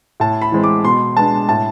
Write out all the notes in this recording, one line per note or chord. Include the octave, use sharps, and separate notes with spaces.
A2 A5
B5
E3 G#3 C4
D6
B2 C6
G#3 B3 D4 A5
A2 A5